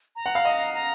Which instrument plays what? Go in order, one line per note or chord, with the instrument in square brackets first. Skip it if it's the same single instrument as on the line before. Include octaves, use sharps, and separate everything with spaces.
[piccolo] A#5
[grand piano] F#5
F5
D#5
[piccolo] A#5